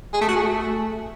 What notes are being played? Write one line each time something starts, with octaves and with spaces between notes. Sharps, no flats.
G#4
A3
F#4
G#4
A3